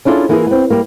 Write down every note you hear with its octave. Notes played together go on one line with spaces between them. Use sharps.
C#4 D4 E4 F4 G#4 A4
E3 A#3 E4 F4 G4 G#4
B3 C4
G3 A#3